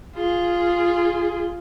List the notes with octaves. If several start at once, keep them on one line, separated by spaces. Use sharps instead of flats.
F4 G#4